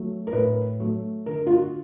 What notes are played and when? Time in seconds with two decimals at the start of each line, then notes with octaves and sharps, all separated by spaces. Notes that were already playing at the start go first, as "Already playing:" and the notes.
Already playing: F#3 A3
0.27 A#4
0.33 A2 B4
0.80 F#3 A3
1.26 D3 A#4
1.47 F4
1.51 F#4